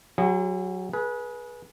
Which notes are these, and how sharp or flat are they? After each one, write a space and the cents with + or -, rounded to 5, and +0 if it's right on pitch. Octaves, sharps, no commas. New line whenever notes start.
F#3 +0 E4 +35 G#4 -40
G#4 +20 B4 -25